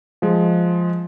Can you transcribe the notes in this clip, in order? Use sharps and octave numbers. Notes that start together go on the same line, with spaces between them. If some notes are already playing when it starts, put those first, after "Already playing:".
F3 G#3